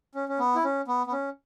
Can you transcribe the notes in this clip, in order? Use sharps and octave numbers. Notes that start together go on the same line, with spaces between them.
C#4
C#4
B3
E4
C#4
B3
B3
C#4